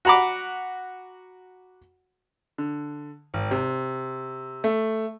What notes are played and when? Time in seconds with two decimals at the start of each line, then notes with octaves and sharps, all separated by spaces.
0.05 F#4 F#5 A#5 B5 D6
2.58 D3
3.34 G#1
3.51 C3
4.64 A3